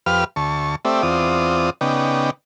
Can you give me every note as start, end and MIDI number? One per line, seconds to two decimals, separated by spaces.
0.06 0.24 41
0.06 0.24 67
0.06 0.24 71
0.06 0.24 77
0.06 0.24 89
0.36 0.75 38
0.36 0.75 81
0.36 0.75 85
0.85 1.02 57
0.85 1.02 60
0.85 1.02 67
0.85 1.02 74
0.85 1.02 76
1.03 1.70 40
1.03 1.70 60
1.03 1.70 65
1.03 1.70 74
1.03 1.70 87
1.81 2.30 49
1.81 2.30 59
1.81 2.30 63
1.81 2.30 74
1.81 2.30 79